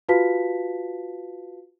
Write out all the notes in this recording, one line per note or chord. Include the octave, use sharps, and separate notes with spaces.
F4 F#4 B4 F5 A5 B6